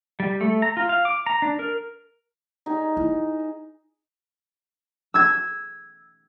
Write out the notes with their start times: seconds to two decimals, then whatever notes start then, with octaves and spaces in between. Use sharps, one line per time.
0.20 G3
0.41 A3
0.62 A#5
0.77 F4
0.89 F5
1.05 D6
1.26 A#5
1.42 D4
1.59 A#4
2.66 D#4 G#4
2.97 E4
5.14 E6 G#6